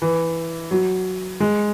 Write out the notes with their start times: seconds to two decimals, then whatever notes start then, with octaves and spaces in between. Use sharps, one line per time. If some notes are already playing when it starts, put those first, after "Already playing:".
0.02 E3
0.71 F#3
1.40 G#3